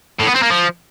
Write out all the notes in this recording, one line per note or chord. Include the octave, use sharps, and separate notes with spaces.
A2
B3
C4
A#3
F3